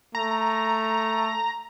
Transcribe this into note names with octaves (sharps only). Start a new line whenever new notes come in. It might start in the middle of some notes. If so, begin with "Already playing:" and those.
A3 A#5